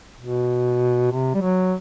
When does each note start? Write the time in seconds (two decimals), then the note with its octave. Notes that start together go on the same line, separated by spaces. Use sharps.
0.20 B2
1.11 C3
1.34 G3
1.42 F#3